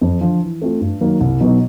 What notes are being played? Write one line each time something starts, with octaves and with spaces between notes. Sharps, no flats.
F2
D3 F3
E3
A3 C4 F4
G2
D#3 F#3 A#3
C2
B2 F#3 B3 D#4